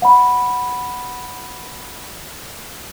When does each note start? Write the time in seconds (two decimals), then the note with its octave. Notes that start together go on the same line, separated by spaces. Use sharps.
0.02 F#5 B5